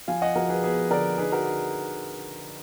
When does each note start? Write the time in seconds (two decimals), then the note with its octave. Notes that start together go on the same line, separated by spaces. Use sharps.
0.08 F3 F5 G#5
0.22 D#5 F#5
0.35 F3 F#4 A#4
0.49 G#4 B4
0.63 B3 G#4 B4
0.90 D3 A#4 D5
1.18 D#4 G#4 B4
1.32 F#4 A#4
1.46 G#4